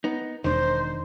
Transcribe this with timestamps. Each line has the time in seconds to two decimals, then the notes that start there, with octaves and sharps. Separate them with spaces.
0.04 B3 D#4
0.44 E1 D#3 D4 D#4 C5